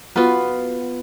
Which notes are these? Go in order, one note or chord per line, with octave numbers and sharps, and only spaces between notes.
B3 F4 F#4 B4 B5